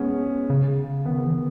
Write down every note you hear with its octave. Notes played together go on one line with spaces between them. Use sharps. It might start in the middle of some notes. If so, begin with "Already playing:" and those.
Already playing: G#3 B3 C#4
C#3
D#3 B3
E3
D#3